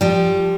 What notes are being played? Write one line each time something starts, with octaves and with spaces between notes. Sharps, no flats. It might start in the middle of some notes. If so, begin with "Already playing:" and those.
F3 G3